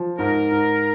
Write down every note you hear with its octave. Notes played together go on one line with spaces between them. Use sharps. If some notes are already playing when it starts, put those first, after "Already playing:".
Already playing: F3
G#2 A#4
G#2